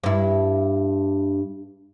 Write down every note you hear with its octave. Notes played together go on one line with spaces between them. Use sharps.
G2 E4